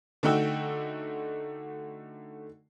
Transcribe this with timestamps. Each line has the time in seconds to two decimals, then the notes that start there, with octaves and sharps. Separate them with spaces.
0.23 D3 A3 D#4 F#4 G5 E6